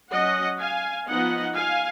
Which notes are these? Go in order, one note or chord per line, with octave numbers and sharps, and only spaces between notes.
F#3 C#4 D#5 F#5
F5 G#5
F3 B3 D#4 D#5 F#5
F5 G#5